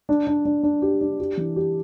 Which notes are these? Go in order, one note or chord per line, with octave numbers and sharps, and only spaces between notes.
D4
D4
D4
D4
G4
D4
G4
E3
G4